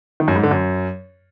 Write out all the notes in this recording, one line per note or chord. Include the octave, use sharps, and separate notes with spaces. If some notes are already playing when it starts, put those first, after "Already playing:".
D#3
F#2
G#2
D3
F#2